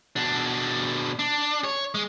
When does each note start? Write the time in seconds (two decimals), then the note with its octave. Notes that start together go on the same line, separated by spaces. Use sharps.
0.16 B2 D4
1.19 D4
1.64 C#5
1.95 G#3